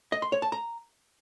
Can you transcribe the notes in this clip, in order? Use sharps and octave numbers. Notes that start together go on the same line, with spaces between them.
D#5
C6
C#5
A5
A#5